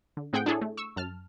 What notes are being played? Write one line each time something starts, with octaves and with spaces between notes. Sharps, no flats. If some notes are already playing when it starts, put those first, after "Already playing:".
D3
A2 C4 G#4 F#5 G5 G6
D4 E4 G#4 A4 C#5
A3
C#6 E6
F#2 A5 F6